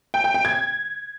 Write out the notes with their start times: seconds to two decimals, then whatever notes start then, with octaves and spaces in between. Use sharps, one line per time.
0.14 G5
0.24 G5
0.34 G5
0.45 G#6